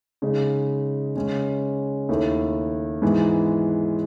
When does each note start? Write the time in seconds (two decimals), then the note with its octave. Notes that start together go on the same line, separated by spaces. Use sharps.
0.22 C#3 G#3 D#4
1.15 C#3 G#3 C#4
2.09 D#2 D#3 A3 E4
3.02 G#2 E3 G#3 B3